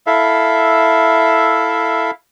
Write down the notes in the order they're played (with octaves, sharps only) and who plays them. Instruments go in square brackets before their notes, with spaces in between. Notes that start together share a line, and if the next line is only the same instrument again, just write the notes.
[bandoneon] E4 A4 E5 F5